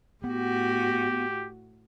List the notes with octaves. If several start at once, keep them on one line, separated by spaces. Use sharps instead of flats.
A2 B3 F#4 G4